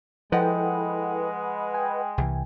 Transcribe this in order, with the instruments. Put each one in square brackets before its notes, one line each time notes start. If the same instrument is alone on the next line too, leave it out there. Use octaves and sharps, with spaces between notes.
[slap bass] F3 [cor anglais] G#3 [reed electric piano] E4 A4 G5 [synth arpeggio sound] B4 D#5 F#5
[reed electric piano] G5 G#5
[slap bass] C2 E3